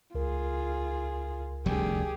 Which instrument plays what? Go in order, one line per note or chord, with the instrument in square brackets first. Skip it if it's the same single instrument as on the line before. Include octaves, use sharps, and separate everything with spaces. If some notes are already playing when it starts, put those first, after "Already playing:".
[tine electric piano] C#2 A#4 [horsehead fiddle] F4 G#4
[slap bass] F1 D2 G3 [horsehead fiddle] G4 G#4